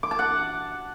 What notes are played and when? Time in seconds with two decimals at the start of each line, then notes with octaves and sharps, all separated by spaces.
0.03 D6
0.11 A5
0.19 F#5